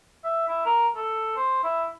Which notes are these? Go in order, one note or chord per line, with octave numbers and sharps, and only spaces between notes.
E5
E4
A#4
A4
C5
E4